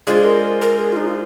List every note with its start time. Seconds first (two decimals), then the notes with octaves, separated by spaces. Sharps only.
0.07 G#3 D4 F4 G#4 C5
0.25 A#4
0.61 A#4
0.79 G#4
0.92 F4
0.97 D#4
1.07 F4